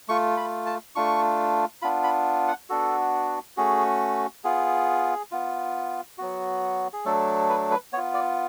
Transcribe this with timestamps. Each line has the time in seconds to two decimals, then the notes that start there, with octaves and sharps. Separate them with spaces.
0.08 A3 F4 C#6
0.37 B5
0.66 A5
0.95 A3 D4 F4 C#6
1.82 B3 D4 F4 B5
2.04 B5
2.48 F#5
2.69 B3 D4 F#4 A4
3.57 A3 C#4 F#4 G#4
4.44 B3 F4 G#4
5.32 B3 F4
6.18 F#3 B3 F#4
6.93 G#4
7.05 F#3 A3 D4 A4
7.49 B4
7.71 B4
7.93 B3 C#5
7.97 F4
8.14 D5